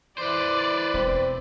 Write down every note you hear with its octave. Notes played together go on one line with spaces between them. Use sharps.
E3 B4 C5 D5
E1 C4